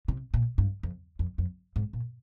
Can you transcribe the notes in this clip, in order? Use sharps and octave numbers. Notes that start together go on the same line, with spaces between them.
C3
A#2
G2
F2
F2
F2
G#2
A#2